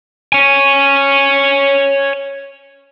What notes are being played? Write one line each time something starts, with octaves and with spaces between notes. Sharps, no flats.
C#5 G#5